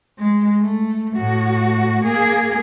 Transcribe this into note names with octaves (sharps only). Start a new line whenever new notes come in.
G#3
A3
A2 F#4
A#3 G#4